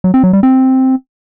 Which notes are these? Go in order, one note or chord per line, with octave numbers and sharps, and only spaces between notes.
F#3
C4
F#3
G3
C4